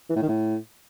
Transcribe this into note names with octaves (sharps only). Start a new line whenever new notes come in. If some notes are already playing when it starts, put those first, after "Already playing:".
E3
A2
D#3
A2